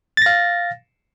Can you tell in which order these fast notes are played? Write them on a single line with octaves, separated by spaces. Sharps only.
A6 A#6 F5